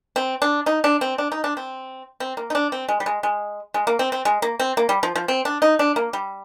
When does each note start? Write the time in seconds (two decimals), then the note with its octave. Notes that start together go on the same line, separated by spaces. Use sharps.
0.16 C4
0.42 D4
0.66 D#4
0.84 D4
1.01 C4
1.18 D4
1.32 D#4
1.44 D4
1.57 C4
2.20 C4
2.37 A#3
2.50 D#4
2.55 D4
2.72 C4
2.89 G#3
3.00 G3
3.06 G#3
3.23 G#3
3.74 G#3
3.87 A#3
3.99 C4
4.12 C4
4.25 G#3
4.42 A#3
4.60 C4
4.77 A#3
4.89 G3
5.03 F3
5.16 F3
5.28 C4
5.45 D4
5.62 D#4
5.79 D4
5.96 A#3
6.13 G3